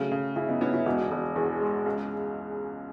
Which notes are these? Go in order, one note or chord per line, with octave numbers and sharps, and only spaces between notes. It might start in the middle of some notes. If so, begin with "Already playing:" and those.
Already playing: C#3 F#3 A3
C#3
C#3 C#4 E4
B3 D#4
B3 C#4 E4
C#4 E4
E1 D#4 F#4
E1
E2 G#4 B4
G#3
C#2